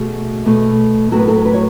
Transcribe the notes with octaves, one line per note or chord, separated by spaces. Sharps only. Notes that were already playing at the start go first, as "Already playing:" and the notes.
Already playing: B2 A3 G#4
B2 A3
A2 F#3 B3 A4
B4
A4
B4
C#5